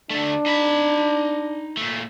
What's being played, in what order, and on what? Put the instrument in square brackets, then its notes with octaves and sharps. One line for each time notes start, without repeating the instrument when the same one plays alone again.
[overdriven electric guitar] D2 A3 [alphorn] D4
[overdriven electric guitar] D#4 B5
A#2 A3